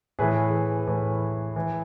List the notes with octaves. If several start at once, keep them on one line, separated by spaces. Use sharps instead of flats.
A2 E3 G#4 B4
A2 E3
E3